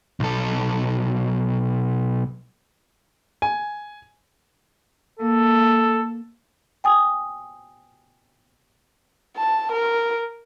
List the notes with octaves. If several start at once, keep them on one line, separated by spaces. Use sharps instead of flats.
B1 A4
G#5
A#3 A4
G5 G#5 D#6
A5
A#4